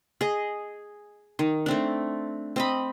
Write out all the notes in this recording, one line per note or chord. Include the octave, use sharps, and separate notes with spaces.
G#4 D#5
D#3
A3 C4 D4
C4 D#5 B5